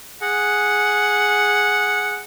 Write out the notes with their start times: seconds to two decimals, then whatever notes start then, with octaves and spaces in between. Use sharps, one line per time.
0.22 G#4 F#5